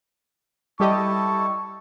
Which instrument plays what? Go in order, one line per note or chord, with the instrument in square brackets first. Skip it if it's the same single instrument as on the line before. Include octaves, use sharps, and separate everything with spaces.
[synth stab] G3 G4 D#5 [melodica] E4 A4 A5 [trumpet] C#6